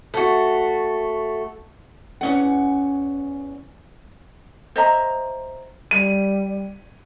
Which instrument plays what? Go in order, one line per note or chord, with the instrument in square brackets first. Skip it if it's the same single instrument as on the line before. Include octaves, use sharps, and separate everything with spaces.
[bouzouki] A3 F#4
[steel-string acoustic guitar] E2 C#4 F#5
[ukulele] C5 D#5 E5 A#5
[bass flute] G3 [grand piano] D#7